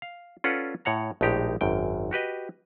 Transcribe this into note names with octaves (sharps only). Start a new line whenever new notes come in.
F5
C#4 F4 A4 B4 D5 F#5
A2 C#5 F#5 A#5
A#1 A2 G#3 D#4 G4 A#5
G#1 F#2 G5
F#4 G4 B4 D#5